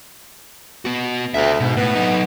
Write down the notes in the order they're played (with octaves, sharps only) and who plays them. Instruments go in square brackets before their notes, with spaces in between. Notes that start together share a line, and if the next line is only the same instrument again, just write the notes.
[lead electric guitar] B3 F#4
[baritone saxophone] D2 [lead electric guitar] C5 E5
[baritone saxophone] G#2 [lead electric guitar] B2
[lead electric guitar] A2 [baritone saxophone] B3
[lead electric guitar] F#3 D#4